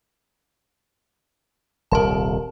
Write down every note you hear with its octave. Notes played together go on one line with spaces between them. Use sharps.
D#1 C2 A#4 A5